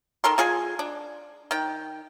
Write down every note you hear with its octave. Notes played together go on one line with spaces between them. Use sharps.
D#3 A4 A#4 C6
G#3 F4 G#4 G#5
D4
D#3 G5